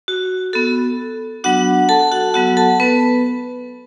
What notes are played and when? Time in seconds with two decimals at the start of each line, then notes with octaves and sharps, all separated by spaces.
0.08 F#4
0.53 B3 F#4 A4
1.44 F#3 B3 D4 F#4 F#5
1.89 A4 A5
2.11 F#4 F#5
2.34 F#3 B3 F#4 F#5
2.57 A4 A5
2.80 B3 B4